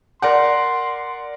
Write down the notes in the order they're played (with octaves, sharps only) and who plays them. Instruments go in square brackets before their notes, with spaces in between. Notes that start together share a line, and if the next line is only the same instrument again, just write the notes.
[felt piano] A#4 D5 F#5 [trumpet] C6